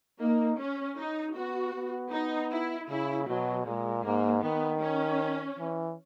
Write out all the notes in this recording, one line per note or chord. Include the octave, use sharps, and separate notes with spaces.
A#3 D#4
C#4
D#4
B3 F#4
B3
D#4
E4
C#3 E4
B2 F#3
A#2 G#3
G#2 A#3
D#3 B3
C#4
E3